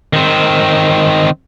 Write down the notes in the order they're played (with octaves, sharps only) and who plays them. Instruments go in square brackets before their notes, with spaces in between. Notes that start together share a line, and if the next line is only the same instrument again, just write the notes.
[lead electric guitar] D#3 C4